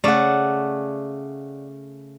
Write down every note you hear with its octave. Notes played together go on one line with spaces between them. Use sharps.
C#3 A3 D5 F#5